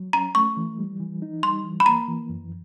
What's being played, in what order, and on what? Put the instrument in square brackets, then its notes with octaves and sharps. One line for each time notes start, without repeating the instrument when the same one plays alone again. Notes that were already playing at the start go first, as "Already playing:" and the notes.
Already playing: [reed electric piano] F#3
[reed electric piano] C#4 [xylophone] A#5
[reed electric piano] A3 [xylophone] C#6
[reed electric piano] E3
G3
E3
D#4
[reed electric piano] G3 [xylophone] C6
[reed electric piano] E3
[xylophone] B5
[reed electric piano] A#3 [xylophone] A#5
[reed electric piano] E3
F#2